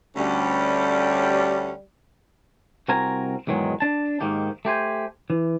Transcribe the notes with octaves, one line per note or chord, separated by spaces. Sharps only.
D2 G3 C#4
C2 C4 F#4 A#4 G#5 A#5
E2 G#2 D#3 F#3 G#3
D4 A5
G#2 D#3 A#3 G4
A3 G4 C5 G#5
E3